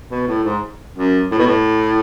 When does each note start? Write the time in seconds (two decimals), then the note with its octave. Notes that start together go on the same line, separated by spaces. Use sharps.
0.10 B2
0.27 A2
0.44 G#2
0.96 F#2
1.31 A2
1.38 B2
1.47 A2